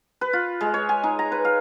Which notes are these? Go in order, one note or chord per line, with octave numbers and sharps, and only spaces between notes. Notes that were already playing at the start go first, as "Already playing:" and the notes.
B4
F4
G#3
C#5
G#5
D#4
A#5
B4
F5